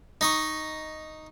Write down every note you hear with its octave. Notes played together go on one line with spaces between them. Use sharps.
D#4 D#5 C#6